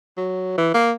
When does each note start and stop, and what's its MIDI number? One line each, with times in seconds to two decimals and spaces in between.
0.17 0.56 54
0.57 0.69 52
0.74 0.92 58